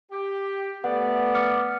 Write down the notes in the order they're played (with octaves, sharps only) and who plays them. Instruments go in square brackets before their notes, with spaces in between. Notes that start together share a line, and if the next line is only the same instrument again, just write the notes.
[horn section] G4
[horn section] A3 D5 [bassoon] B3 [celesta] F#5
[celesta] D6 F6 C#7